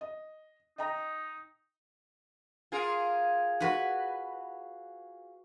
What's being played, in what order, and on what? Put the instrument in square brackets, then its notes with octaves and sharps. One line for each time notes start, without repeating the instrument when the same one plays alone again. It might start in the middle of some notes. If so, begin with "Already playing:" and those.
[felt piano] D#5
[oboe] D#4 [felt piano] D#5 G5 A#5
[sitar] F4 G#4 A#4
[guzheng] F#4 B4